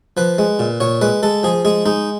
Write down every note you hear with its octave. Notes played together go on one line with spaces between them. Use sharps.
F3 B4
G#3
A#2
A#2 C#5
G#3 B4
G#3 A4
F3 G#4
G#3 G#4
G#3 D#4